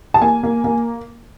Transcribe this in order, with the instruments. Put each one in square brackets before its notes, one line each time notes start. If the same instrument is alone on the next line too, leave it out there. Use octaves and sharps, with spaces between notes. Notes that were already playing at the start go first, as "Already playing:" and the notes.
[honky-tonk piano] A5
A#3 G#5
A#3
A#3